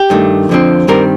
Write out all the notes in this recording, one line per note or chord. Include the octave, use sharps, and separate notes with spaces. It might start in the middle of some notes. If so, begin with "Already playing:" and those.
Already playing: G4
G2 D#3 A3
F2 D3 F3 C4
G2 D#3 G3 C4 A#4